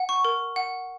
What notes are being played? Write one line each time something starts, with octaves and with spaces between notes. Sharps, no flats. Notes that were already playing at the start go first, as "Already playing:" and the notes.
Already playing: F#5
C#6
A#4
F#5